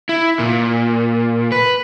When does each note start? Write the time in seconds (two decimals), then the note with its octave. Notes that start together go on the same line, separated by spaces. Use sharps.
0.09 E4
0.39 A#2
1.52 B4